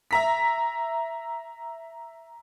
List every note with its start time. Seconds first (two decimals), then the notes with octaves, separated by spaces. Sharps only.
0.11 E5 A#5 B6